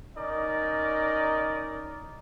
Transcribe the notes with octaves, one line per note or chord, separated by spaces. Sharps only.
C#4 D#4 A#4 D5 D#5